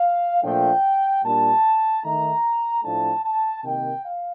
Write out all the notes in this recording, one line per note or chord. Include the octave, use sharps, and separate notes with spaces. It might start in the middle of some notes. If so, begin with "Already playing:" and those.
Already playing: F5
A#2 F3 A3 D4 G5
A#2 G3 A#3 D4 A5
D#3 A3 D#4 A#5
A2 F3 A3 D4 A5
A5
C3 D#3 A#3 G5
F5